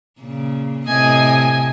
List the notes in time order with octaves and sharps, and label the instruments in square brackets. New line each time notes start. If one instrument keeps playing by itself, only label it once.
[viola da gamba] A#2 C#3
[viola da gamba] A2 C3 D#5 [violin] G#5